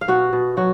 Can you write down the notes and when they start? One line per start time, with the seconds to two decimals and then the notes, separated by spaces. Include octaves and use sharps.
0.01 F5
0.08 B2 F#4 F#5
0.33 B2
0.57 F#3 F#4 F#5